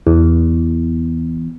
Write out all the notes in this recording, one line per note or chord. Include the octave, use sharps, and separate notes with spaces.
E2